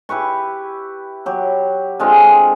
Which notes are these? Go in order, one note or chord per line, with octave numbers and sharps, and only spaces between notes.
E4 G4 B4 C#6
F#3 G4
D3 G#3 C4 F4